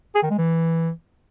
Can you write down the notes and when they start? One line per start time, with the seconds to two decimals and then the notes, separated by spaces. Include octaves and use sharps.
0.15 G#4
0.23 D#3
0.31 G#3
0.38 E3